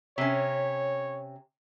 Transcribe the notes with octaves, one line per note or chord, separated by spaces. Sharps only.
C3 C#4 C#5